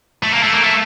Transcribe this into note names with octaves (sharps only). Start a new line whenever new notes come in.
A3
A#3
A3
A#3
A3